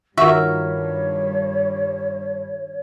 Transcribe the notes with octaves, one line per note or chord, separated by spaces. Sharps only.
G2 D#3 F4 F#4 A#4 C#5 E5